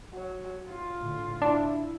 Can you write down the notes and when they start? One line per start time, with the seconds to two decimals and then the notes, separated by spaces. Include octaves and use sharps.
0.14 F#3
0.69 F4
1.01 A2 D3
1.42 D4 E4